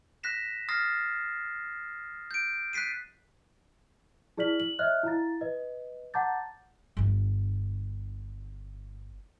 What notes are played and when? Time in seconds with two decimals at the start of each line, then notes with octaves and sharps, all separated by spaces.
0.23 F#6 A#6 B6 E7
0.69 D#6 F6 A6 A#6 C7
2.31 G6 D7
2.73 F#6 A6 B6 C7 D#7
4.38 E4 G#4 D5 F6 B6 F#7
4.60 F#7
4.79 C#5 D#5 E5 F6 F#6
5.03 E4 F5 A#5 A6
5.41 B4 D#5
6.14 F#5 A5 A#5 D6 G6 A6
6.97 G1 D4